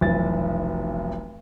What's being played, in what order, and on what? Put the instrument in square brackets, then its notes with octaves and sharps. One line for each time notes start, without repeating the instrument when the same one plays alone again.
[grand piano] F1 B1 E3 A6